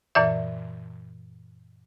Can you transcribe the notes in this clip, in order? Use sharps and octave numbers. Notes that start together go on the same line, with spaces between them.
F#2 A#2 E3 D5 E5